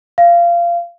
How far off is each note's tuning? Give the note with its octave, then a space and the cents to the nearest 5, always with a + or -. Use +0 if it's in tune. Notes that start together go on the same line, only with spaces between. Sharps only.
F5 -20